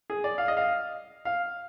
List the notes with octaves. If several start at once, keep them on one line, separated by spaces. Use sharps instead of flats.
G#4
D5
F5
D#5
F5
F5